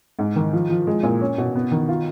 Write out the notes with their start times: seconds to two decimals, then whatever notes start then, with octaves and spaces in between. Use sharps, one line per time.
0.19 G#2
0.36 D#3
0.53 F3
0.70 F3
0.87 G#3
1.03 A#2
1.20 C#4
1.38 B2
1.55 B3
1.71 D#3
1.89 F4